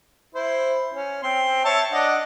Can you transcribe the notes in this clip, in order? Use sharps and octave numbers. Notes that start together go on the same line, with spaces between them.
E4 C5
C#4
C4 C6
C#5 E5 A5
D4 D#5 F#5